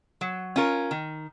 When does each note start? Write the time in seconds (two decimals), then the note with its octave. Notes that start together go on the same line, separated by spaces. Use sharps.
0.21 F#3
0.56 C#4 F4 A#4
0.91 D#3